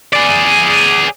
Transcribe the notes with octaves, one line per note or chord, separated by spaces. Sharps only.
G#4 D5